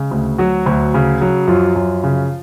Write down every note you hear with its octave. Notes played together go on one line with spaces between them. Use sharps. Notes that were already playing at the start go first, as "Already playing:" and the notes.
Already playing: C#3 G#3
D2
F#3 F#4
D2
C#3
F#3
F#2 F3 F4
F#2
C#3